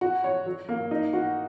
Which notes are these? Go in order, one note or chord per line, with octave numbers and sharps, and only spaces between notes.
F#4
C#5
F#3
A#3
D#4
F#4